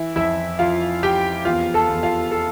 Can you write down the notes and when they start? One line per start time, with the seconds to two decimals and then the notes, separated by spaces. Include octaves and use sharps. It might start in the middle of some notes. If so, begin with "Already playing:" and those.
Already playing: E3 E4
0.16 F2 E4 E5
0.59 F2 F4 F5
1.03 F2 G4 G5
1.45 E2 F4 F5
1.74 A4 A5
1.89 E2
2.03 F4 F5
2.32 A4